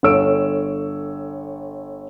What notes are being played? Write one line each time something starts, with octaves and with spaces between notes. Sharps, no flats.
G1 A4 C#5 E6 D7